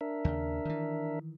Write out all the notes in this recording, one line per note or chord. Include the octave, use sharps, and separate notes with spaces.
D4 A#4 E5
D#2 C#3
D#3 E3